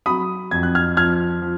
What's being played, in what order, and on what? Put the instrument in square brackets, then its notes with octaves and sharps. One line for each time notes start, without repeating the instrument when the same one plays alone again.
[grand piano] F#3 B5 D#6
F2 G#6
F#6
F6 G#6
F3 F6 G#6
F3